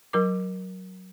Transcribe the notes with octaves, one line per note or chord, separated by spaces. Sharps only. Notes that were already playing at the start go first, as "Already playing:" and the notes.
F#3 A#4 D6